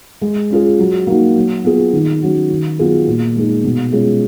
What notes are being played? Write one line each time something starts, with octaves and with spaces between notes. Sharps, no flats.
G#3
C#4 F4 G#4
F#3
A#3 D#4 F#4
F#3
B3 F4 G#4
D#3
F#3 C#4 F#4
D#3
F#3 B3 F4 G#4
A#2
G#3 D#4 G#4
B2
G#3 C#4 F4 G#4